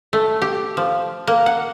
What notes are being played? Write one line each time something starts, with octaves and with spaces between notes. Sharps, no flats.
A3
G4
F3
A#3
F#5